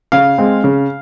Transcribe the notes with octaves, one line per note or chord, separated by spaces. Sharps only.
C#3 F5
G#3 C4
C#3